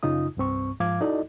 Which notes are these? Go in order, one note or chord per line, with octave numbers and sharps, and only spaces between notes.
F#2 C#3 D#4 F4 D#6
C2 G2 C4 C#6
G#2 F3 F5 D6 G#6
D#4 E4 F#4 A4 D5 D#5